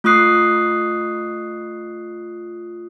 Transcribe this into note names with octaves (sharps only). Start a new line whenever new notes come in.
A3 F4 C#6 D#6 F#6 C7